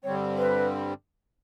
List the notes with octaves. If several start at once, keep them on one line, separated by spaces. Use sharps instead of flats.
G2 D3 G3 C4 C#5
B4